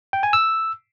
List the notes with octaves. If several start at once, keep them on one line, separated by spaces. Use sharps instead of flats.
G5
G#5
E6